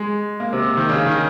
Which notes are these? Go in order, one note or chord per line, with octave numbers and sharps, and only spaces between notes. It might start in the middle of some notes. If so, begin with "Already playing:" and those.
Already playing: G#3
A#3
C3
D#3
C#3
D#3